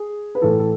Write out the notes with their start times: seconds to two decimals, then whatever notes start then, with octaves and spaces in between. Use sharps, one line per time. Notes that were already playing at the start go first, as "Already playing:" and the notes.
Already playing: G#4
0.35 B4
0.42 A2 E3 A4
0.59 A4